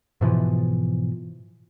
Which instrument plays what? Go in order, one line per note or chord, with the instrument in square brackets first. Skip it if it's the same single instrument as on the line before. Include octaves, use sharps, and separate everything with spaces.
[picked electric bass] G#2 B2 E3 F3